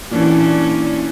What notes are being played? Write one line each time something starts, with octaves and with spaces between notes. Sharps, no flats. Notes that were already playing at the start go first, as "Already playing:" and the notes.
A#2 E3 C#4 D4